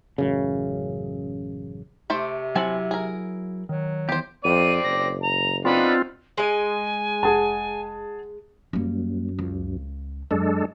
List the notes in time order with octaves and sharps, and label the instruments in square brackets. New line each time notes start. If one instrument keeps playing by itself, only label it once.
[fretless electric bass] A1 F#2 C#3
[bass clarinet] C3 [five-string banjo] A3 C5 D5
[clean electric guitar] F#3 E4 F#5 [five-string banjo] C4 G#5 A5
[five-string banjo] G#4 A#4
[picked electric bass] D#3 [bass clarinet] F#3
[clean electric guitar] E2 [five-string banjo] G4 C5
[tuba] F2 [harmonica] C4 D5 [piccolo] D#7
[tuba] F#1 [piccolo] A#6
[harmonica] A#5 [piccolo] F7
[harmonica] B3 D4 D#4 [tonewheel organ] C4 F4 [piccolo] B5
[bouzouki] G#3 D#5 [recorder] G#5
[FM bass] F1 [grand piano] G#4 F#5 A5
[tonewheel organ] F#2 [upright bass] G3 A#3
[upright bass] C#2
[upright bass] F#2 [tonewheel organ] G#3 D4 A4